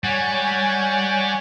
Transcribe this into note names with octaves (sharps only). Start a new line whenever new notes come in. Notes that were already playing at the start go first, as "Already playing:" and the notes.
G3 C#5 F#5 G#5